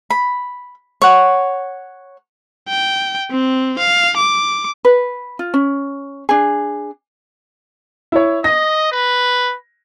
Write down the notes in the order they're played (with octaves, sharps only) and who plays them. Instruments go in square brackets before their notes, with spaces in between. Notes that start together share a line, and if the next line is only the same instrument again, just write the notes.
[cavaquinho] B5
C#5 F#5
[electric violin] G5
C4
F5
D6
[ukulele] B4
F4
C#4
D4 G#4
[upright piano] E4 C#5
[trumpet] D#5 [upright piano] A#6
[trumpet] B4